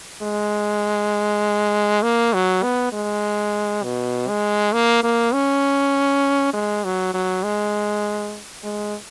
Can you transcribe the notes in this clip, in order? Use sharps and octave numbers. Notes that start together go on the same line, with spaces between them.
G#3
A#3
F#3
B3
G#3
B2
G#3
A#3
A#3
C#4
G#3
F#3
F#3
G#3
G#3